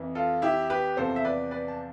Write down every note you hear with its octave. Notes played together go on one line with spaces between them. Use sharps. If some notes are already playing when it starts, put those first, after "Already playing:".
Already playing: F2 E3
F4 A4
E4 G4
G4 B4
E2 C3 F3 A4 C5
E5
B4 D5
B4 D5
A5